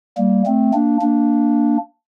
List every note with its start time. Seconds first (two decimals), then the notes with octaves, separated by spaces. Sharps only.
0.17 G3 A#3
0.46 A3 C4
0.73 A#3 D4
1.02 A#3 D4